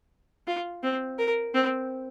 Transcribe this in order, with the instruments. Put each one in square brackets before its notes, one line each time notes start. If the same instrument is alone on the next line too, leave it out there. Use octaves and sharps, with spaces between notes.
[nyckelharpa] F4
C4
A#4
C4